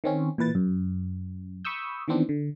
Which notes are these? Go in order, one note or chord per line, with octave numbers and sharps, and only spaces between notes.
D#3 C4 C#4
A#2 E3 B4 A6
F#2
B5 C#6 D#6 E6 G6
D#3 E3 B3 C4 D4
D3